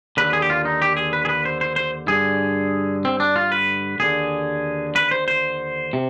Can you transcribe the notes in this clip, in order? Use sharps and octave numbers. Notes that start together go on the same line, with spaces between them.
D#2 D3 B4
G#4
G4
F4
D#4
G4
G#4
B4
G#4
B4
C5
C5
C5
G2 D3 G#4
C4
D4
F4
B4
D#2 D3 G#4
B4
C5
C5
C3